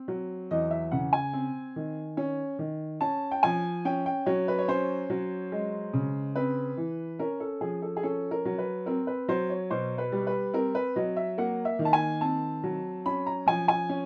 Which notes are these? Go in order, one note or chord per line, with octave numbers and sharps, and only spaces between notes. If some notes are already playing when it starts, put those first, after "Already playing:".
Already playing: C4
F#3
E2 D#5
E5
C#3 F#5
G#5
C4
D#3
C#4
D#3
C#4 A5
G5
F3 G#5
C#4 G5
G5
F#3 C#5
B4
C#5
C#4 C5
F#3
G#3
C#3
C4 B4
E3
C#4 A#4
A4
F3 G#4
A4
G#4
C#4 A4
A#4
F#3
B4
C4 A#4
B4
F#3 C5
C#5
B2 C5
B4
G3
B4
C4 A#4
B4
F#3 D#5
E5
A#3 F#5
E5
D#3
A5
G#5
C4 A5
F#3
C#4 B5
A#5
F3 G#5
G#5
C#4